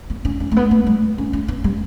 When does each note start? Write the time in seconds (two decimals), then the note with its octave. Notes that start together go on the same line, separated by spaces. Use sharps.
0.10 B3
0.25 C#4
0.40 C#4
0.51 A3
0.56 B3
0.71 A3
0.86 G3
1.18 C#4
1.33 C#4
1.48 B3
1.64 G3